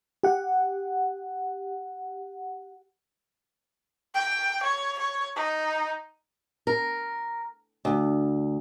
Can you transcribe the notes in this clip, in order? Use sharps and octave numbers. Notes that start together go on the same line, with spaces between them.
G4 F#5
G5
C#5
C#5
D#4
A#4
D2